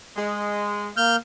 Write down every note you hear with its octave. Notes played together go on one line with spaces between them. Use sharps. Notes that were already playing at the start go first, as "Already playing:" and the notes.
G#3
A#3 F6 G6